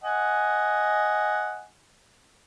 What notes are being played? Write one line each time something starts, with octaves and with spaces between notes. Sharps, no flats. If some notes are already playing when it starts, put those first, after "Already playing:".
D#5 F#5 G#5